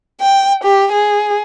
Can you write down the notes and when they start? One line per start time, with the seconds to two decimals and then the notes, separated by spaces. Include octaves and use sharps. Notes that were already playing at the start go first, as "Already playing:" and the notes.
0.20 G5
0.63 G4
0.92 G#4